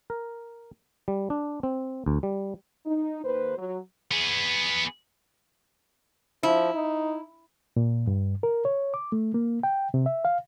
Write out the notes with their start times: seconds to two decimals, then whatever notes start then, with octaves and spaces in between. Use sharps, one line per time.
0.10 A#4
1.08 G3
1.30 D4
1.63 C4
2.06 D2
2.23 G3
2.86 D#4
3.24 D#2 B4 C5
3.57 F#3
4.11 B3 G#4
6.43 F3 E4
6.74 D#4
7.77 A#2
8.07 G2
8.43 A#4
8.65 C#5
8.94 D6
9.12 A3
9.34 A#3
9.63 G5
9.94 C3
10.06 E5
10.25 F5